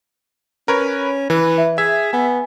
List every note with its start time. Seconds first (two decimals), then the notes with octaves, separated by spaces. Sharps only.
0.68 C#4 A#4 B4 C#5
1.30 E3 B4
1.58 E5
1.78 G#4 E5 G#6
2.13 B3 G#5